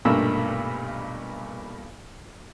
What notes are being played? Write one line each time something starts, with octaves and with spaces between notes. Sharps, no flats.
B1 G2 A#2 A3 A#3 E6